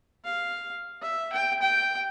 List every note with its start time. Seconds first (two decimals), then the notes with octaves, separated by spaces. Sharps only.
0.25 F5
1.02 E5
1.33 G5
1.62 G5